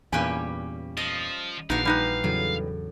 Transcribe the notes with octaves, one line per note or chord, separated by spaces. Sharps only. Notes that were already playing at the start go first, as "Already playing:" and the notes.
E2 G2 A#2 G3 C#4 G4 G#5
F3 D#5
A#1 E3 D4 D#4 F#4 F5
G3 D#4 B4
E2 A2 C#3 F#3